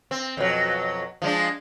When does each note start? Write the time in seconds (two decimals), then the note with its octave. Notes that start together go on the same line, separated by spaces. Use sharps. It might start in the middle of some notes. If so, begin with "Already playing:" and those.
0.11 C4
0.37 F2 B2 F#3
1.22 F3 G#3 D4